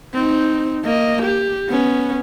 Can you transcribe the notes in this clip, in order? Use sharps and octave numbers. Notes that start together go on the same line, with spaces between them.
C4 D#4
A#3 D#5
G4
B3 C#4